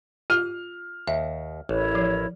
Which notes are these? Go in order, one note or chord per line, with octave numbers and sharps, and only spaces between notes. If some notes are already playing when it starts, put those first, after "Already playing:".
F4 F6
D#2 E5
A1 E4 A#4 C#5
F3